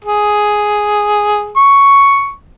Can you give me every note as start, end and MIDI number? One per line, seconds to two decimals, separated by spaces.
0.04 1.51 68
1.57 2.33 85